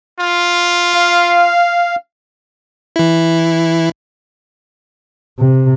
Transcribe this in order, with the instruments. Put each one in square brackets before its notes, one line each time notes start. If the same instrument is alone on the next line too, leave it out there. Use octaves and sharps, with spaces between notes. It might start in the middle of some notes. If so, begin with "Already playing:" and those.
[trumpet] F4
[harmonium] F5
[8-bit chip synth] E3 E4
[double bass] C3